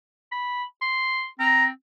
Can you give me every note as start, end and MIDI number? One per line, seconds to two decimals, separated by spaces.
0.32 0.64 83
0.82 1.28 84
1.39 1.71 60
1.39 1.64 82